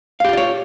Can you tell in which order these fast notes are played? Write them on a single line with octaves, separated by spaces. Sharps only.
F5 G4 F4 D5 C#5